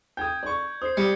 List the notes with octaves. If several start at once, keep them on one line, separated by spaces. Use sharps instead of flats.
G5 D#6 G6 G#6
D5 C#6
C5 D#6 C7
G3 D#6 C#7